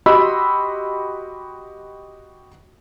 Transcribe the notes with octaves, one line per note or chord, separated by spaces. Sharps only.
F#4 G4 D#5 B5 C6 E6